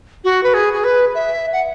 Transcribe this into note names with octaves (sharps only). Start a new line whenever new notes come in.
F#4
B4
G#4
G#4
B4
E5
F#5